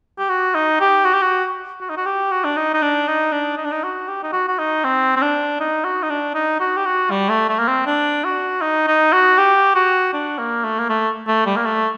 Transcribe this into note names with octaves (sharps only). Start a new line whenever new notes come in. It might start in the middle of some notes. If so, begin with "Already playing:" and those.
G4
F#4
D#4
G4
F#4
G4
F#4
F#4
D#4
F#4
G4
F#4
D4
D#4
D#4
D4
D#4
D4
D#4
D4
D#4
F#4
G4
D#4
F#4
F#4
D#4
C4
C4
D4
D#4
F#4
D#4
D4
D#4
F#4
G4
F#4
G3
A3
A3
A#3
C4
D4
F#4
D#4
D#4
F#4
G4
F#4
D4
A#3
A3
A#3
A3
A3
G3
A#3
A3